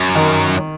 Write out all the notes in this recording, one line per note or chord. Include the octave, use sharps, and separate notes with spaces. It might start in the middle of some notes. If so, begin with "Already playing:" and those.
Already playing: F#2
D#3